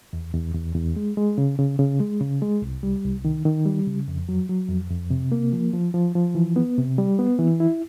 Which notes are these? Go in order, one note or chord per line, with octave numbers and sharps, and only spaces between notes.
E2
E2
E2
E2
G#3
G#3
C#3
C#3
C#3
G#3
C#3
G#3
C2
G3
C2
D#3
D#3
G3
C#3
F2
F#3
F#3
F2
F2
C3
A#3
F3
F3
F3
F3
E3
B3
C3
G3
B3
E3
E4